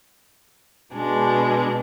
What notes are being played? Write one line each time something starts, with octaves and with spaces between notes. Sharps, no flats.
B2 G#3 D4